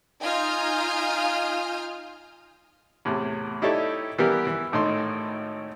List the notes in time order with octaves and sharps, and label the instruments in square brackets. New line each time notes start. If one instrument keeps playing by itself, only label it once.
[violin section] D#4 F4 G#5 D#6 F6 G6
[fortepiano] E2 A2 C3
D#4 E4 G4 A4 C#5 D5
E3 G3 B3 G4 A#4 D5
E3
G#1 A2 D#4 A4 C6